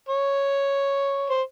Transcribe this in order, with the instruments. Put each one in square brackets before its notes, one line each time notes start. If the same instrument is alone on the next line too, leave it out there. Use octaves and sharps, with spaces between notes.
[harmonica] C#5
C5